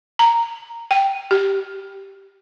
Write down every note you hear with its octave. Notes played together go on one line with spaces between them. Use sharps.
A#5
G5
G4